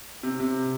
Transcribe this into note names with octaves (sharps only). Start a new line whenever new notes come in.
C3
C3